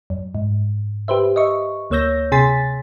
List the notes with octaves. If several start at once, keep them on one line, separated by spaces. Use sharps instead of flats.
F#2
G#2
G4 B4 C5 E5
D#5 E5 C#6
D2 A#3 C#5 E6 G6 A#6
C3 G#4 G#5 C6 A6 B6